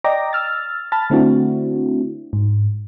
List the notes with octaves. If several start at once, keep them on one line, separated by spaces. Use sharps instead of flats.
D5 D#5 G5 A#5 D6 A#6
E6 F6 A6
A5 B5 F6 A6
D3 A3 C4 D4 E4 F#4
G#2